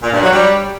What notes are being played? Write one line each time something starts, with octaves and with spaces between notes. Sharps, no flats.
A#2
G2
F#3
G3